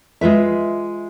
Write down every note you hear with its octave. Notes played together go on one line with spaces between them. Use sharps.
G#3 F4 B4 E5